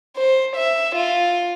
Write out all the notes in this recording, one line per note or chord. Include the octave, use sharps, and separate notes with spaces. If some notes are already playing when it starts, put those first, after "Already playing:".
C5
E5
F4